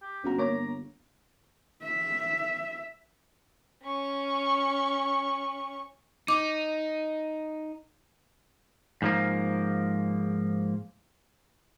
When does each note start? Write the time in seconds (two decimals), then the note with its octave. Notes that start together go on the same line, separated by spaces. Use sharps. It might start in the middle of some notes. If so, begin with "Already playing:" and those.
0.02 G4
0.24 G1 C#4 F#4 A#5
0.38 A#3 C#5 A#5 D6
1.83 E5
3.83 C#4 C#6
6.28 D#4 D6
9.02 G#2 F3 A#3